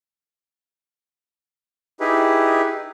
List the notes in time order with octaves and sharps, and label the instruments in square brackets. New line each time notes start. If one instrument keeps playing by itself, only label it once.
[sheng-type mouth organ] D#4 E4 G4 G#4 B4